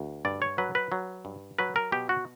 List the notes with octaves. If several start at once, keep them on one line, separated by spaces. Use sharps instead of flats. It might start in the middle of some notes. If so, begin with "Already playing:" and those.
Already playing: D2
G2 D5
C#5
F#3 B4
B4
F#3
G2
F#3 B4
A#4
B2 G4
F#4